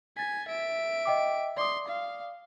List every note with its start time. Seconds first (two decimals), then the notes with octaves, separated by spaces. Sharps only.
0.17 G#5 A6 B6
0.48 E5 D7
1.05 D#5 G5 D6
1.57 D5 C6 D6 D#6
1.88 F5